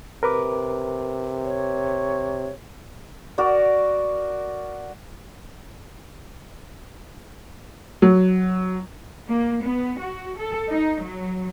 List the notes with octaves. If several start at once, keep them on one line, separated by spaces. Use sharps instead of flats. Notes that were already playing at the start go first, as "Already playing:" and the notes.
C3 A#4 B4 D6
C#5
F#4 A#4 D5
F#3
A#3
B3
F#4
A4
D#4
F#3